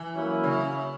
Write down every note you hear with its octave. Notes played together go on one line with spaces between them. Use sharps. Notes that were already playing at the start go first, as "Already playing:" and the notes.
Already playing: E3
F#3 A#3 C#4 E4
C#3